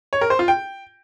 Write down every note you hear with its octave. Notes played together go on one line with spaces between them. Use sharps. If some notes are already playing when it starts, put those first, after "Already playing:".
C#5
A#4
C5
F4
G5